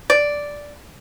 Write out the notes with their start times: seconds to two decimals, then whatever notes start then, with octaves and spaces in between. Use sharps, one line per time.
0.10 D5